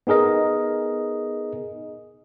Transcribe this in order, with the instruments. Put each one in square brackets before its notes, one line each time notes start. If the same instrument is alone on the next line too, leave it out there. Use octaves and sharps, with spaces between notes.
[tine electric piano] B3 D#4 G#4 A#4 D#5